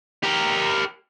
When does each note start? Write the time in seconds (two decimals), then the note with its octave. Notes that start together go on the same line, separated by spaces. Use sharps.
0.23 G4 A#4